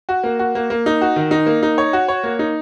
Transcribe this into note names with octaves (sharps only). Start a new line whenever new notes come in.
F#4
A#3
F#4
A#3
A#3
D#4
F#4
D#3
D#4
A#3
D#4
C#5
F#4
C#5
A#3
D#4